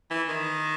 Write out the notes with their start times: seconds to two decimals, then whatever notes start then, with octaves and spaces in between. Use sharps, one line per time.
0.10 E3
0.28 D#3